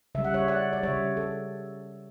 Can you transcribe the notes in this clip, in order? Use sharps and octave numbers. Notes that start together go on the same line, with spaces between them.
C#3 G3 E5
F#5
C#5 E5
D5 F#5
D5
C#3 G3 C#5 E5
A4